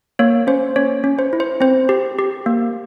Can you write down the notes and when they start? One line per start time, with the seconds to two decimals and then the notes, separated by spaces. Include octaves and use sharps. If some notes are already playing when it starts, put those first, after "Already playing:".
0.19 A#3 C#5
0.47 C#4 C5
0.76 C#4 C#5
1.04 C#4
1.19 C5
1.33 E4
1.40 C5
1.60 C4 C5
1.89 G4
2.19 G4
2.46 A#3